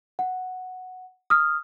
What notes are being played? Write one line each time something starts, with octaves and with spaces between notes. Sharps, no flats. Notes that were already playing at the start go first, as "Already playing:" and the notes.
F#5
D#6 F6